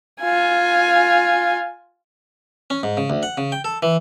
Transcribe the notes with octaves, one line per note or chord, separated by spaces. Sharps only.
F4 G#5
C#4
G#2
C#3
D2
F#5
C#3
G5
A4
E3